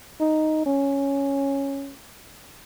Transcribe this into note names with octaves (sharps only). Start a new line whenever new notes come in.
D#4
C#4